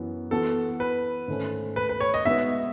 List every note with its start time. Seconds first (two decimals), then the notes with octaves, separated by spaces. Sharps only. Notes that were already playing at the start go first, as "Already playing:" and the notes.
Already playing: F#2 E3 B3
0.31 E3 B3 F#4 A4
0.80 B4
1.28 G#2 D#3 A3 C#4
1.76 B4
1.89 B4
2.00 C#5
2.14 D#5
2.25 G#3 B3 D#4 F#4 B4 E5